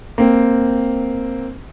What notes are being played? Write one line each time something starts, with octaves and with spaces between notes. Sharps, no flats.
A#3 C4